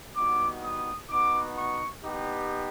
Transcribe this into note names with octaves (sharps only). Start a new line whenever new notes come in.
G3 B3 D#4 F#4 D6
D#6
B3 D#4 F#4 D6
C#6
B3 D#4 G4